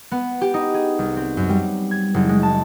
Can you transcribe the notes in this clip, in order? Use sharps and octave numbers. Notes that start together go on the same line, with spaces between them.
B3
G4
D#4
G#4
C2
C4
F#2
G3
G#6
F#1
G#3
A5